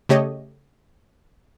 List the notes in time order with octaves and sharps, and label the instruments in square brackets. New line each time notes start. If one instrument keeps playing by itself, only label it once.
[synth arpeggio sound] C#3 A3 G4 C#5 D#5